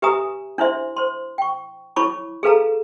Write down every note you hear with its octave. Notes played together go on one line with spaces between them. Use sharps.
G4 B4 E5 G#5 A#5 D#6
D4 E4 C5 E5 C6
C5 C6
G5 C#6
E4 C#5 A5 B5 C#6 D6
G#4 A4 B4 F5 A5 A#5